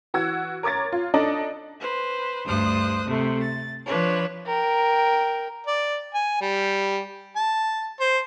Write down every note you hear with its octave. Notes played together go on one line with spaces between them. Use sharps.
E3 F#4 E6 G#6
A#4 C#5 D6 G#6 A6
F4
D4 D#4 A4 D5 D#5
B4 C5
D2 G2 C5 D#6 F#6
C3 A3
A6
F3 D4 B4 C#5
A#4 G5
D5
G#5
G3
A5
C5